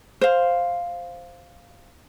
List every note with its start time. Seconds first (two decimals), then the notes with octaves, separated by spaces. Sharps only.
0.21 C5 F5